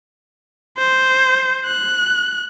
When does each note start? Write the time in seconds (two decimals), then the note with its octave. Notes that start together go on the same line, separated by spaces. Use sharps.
0.78 C5
1.65 F#6